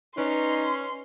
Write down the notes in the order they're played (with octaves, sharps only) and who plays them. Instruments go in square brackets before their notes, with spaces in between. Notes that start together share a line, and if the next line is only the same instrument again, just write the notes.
[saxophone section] C#4 [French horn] D#4 [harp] B4 D5 [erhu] C6